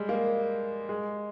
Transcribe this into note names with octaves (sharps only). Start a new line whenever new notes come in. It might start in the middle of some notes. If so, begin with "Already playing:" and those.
Already playing: G3 G#3
A#3
G#3